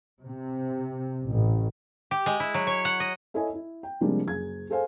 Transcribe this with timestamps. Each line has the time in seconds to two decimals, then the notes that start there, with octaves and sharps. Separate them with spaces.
0.24 C3
1.25 A1
2.11 G4
2.26 G#3
2.40 E4
2.54 F#3
2.67 C#5
2.85 F#5
3.00 D#5
3.34 E4 A4 C#5 D#5 G#5
3.53 E4
3.83 G5
4.01 C3 F3 G3 G#3 A#3 D4
4.27 F#1 G#4 G#6
4.70 G#4 A4 C5 F5 G#5